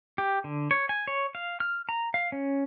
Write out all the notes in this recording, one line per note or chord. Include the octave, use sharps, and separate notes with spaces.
G4
D3
C#5
G#5
C#5
F5
F6
A#5
F5
C#4